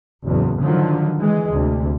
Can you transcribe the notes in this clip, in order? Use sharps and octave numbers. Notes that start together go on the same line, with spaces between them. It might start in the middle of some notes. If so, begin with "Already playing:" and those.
F#1 E2 A2
G#2 D3 D#3 F3 F#3
E3 G#3
D2 C3